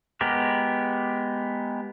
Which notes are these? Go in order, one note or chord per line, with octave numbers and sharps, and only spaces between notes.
G#3 B3 G4 A#4